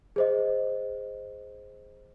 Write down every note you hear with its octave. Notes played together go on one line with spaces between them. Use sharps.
G#4 C5 D#5